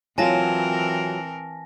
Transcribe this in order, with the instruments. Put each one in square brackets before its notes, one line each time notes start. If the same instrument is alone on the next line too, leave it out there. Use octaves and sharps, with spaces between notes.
[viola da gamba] E3 C4 A#4 [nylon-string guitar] F#3 F4 [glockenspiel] G#5 A5 A#6